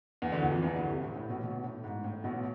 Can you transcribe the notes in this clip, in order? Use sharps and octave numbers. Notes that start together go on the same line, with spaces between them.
E2 E3
D2 D3
E2 E3
F2 F3
E2 E3
D2 D3
C2 C3
A2
A2
B1 B2
B1 B2
A2
G#2
A2
B1 B2